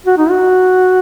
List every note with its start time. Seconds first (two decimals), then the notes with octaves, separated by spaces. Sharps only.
0.06 F#4
0.18 D#4
0.30 F#4